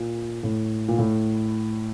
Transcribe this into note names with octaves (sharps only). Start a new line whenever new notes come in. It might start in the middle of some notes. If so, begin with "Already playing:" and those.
Already playing: A#2
A2
A#2
A2